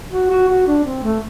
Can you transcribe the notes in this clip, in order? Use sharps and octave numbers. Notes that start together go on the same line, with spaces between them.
F#4
F#4
F#4
D4
C4
A3